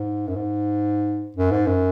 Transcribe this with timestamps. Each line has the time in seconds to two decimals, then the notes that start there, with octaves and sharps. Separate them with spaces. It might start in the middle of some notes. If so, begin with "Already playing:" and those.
Already playing: G#2
0.27 F#2
0.36 G#2
1.37 F#2
1.51 G#2
1.66 F#2